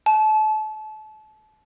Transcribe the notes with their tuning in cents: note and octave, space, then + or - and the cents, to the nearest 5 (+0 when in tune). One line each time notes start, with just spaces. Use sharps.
A5 -30